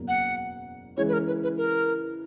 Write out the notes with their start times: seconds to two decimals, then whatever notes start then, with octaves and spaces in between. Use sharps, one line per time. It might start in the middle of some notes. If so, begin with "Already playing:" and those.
Already playing: F#1 E2 B2 F#3 A#3
0.08 F#5
0.97 C#3 E3 G#3 C#5
1.08 B4
1.13 A#4
1.27 B4
1.43 B4
1.57 A#4